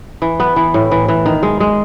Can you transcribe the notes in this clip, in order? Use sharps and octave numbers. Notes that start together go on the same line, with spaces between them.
E3
B3
E3
A2
E3
E3
D#3
G#3
G#3